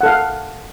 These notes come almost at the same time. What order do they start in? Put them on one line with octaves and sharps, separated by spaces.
F#5 A4 F5